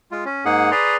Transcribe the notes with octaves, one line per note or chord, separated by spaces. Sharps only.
G#3 F4
C#4
G#2 A#3 D#4 G#4 F#5
G#4 B4 D5 A#5 C6